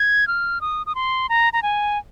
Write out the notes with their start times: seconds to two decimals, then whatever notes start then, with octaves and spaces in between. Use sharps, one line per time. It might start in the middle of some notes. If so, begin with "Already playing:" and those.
Already playing: G#6
0.28 F6
0.61 D#6
0.86 D#6
0.95 C6
1.29 A#5
1.53 A#5
1.63 G#5